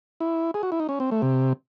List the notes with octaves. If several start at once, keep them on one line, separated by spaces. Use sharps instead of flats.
E4
G#4
F#4
E4
D#4
C#4
C4
A3
C3